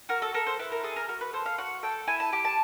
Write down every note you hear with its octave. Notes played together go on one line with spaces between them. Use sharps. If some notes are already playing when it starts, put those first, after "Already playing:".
F#4 A#4
A4
A4 A#4
C5
E4 B4
A#4
G#4 A4
A#4
F#4 A#4
B4
A4 C5
F5
F#4 F#5
A4 G5
E4 G#5
A5
G4
A5